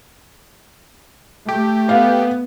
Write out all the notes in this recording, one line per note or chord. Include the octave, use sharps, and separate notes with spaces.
A3 G4
B3 F5